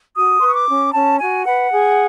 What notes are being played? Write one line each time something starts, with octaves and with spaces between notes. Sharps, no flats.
F#4 D#6
B4 C6
C#6
D6
C#4
C#4 A5
F#4 G#5
B4 F#5
G#4